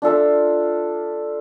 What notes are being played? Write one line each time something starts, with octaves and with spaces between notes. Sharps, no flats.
D4 F4 A4 E5